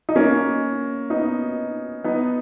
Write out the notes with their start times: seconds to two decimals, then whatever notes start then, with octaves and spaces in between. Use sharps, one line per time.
0.09 D#4
0.16 A#3 C#4
1.10 B3 D#4
2.04 B3 D#4